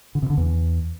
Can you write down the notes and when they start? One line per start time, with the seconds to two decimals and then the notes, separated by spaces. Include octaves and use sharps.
0.15 D3
0.22 C3
0.30 D3
0.37 E2